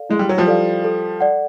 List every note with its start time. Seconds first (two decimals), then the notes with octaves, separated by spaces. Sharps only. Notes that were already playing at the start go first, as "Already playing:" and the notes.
Already playing: A4 D5 F5
0.09 G#3 E4
0.19 G3
0.29 F#3
0.38 F3 G3
0.47 A4 D5 F5
0.84 A4
1.21 D5 F#5